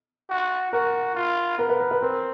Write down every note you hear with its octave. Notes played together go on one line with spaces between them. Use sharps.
F#4
F#4 A#4
F4
B3 A#4
B4
A#4
B4
C4 A#4